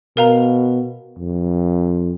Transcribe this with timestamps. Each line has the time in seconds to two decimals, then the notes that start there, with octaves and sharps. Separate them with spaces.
0.17 B2 A#4 F5 A#5
1.19 F2